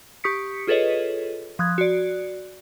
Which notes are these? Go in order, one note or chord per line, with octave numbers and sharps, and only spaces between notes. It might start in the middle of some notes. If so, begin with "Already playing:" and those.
G4 C#6 D#6 B6 C#7
F4 G#4 A4 B4 C#5 D#5
F3 D#6 F#6 G#6
F#4 D5